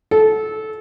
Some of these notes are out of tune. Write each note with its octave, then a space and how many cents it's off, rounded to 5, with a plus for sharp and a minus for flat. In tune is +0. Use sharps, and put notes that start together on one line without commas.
A4 -20